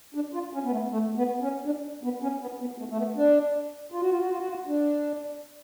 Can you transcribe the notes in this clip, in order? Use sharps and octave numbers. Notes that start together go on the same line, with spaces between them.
D4
F4
C#4
B3
A3
A3
B3
C#4
D4
B3
C#4
B3
B3
A3
A3
B3
D4
F4
F#4
F4
F#4
F4
F#4
F4
D4